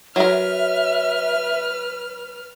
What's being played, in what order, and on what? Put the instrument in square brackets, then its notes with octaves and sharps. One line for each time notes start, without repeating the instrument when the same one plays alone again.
[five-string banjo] F#3 A#4 [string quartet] B4 F6 [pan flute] E5